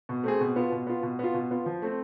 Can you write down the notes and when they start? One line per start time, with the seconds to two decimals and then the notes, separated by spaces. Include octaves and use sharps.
0.09 B2
0.24 A3 C4 G#4
0.40 B2
0.56 B3 F4
0.72 B2
0.87 B3 F4
1.03 B2
1.19 B3 F4
1.34 B2
1.51 B3 F4
1.66 F3
1.82 A3 C4